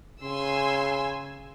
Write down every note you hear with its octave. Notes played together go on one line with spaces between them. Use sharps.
C#3 G#5 C6 E6